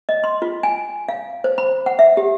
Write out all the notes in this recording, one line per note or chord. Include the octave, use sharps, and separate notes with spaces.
D#5
C6
F4
G#5
F5
C5
B5
F#5
E5
G4